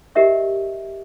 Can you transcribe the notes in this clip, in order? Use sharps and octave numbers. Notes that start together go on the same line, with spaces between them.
G4 A#4 D#5 E5 C#6